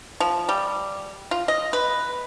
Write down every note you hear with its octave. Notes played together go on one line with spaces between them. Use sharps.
F3
G3
F4
D#5
B4